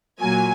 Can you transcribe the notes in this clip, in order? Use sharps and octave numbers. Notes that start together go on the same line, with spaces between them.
A#2 F#3 A#3 G#5